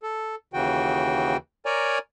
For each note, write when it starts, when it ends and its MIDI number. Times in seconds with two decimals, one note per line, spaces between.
0.03 0.35 69
0.54 1.37 39
0.54 1.37 49
0.54 1.37 52
0.54 1.37 66
0.54 1.37 79
1.66 1.98 70
1.66 1.98 73
1.66 1.98 74
1.66 1.98 80
1.66 1.98 82